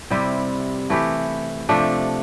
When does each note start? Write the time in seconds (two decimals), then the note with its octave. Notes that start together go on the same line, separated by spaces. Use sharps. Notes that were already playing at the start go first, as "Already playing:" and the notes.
0.10 C3 G3 C4 E4
0.90 E3 A3 E4 G4
1.69 C3 F3 A3 D4